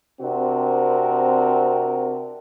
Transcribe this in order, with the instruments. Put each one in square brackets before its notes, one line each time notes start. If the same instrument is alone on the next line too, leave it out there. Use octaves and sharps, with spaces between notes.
[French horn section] C3 C4 D4 F#4 A#4